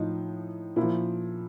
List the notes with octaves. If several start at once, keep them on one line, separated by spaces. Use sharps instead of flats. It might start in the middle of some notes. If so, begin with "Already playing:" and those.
Already playing: A2 F3 D#4
A#2 E4
F3